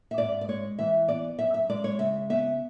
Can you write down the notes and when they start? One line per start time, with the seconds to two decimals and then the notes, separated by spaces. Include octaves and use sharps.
0.11 E5
0.18 G#2 D5
0.41 D5
0.48 G#3 C#5
0.79 E3 E5
1.08 B3 D5
1.39 F#2 E5
1.54 E5
1.69 G#3 D5
1.84 C#5
1.99 C#3 E5
2.30 B3 E5